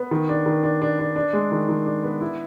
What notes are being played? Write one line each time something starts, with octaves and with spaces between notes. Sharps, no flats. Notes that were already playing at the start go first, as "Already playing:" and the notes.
Already playing: B3
D#3
D4
D#3
D4
D4
D4
D4
G#3
D#3
D#3
D4
B3
E4